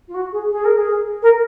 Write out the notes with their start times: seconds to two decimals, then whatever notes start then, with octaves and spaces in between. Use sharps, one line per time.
0.07 F4
0.14 F#4
0.32 G#4
0.50 G#4
0.64 A#4
0.77 G#4
1.22 A#4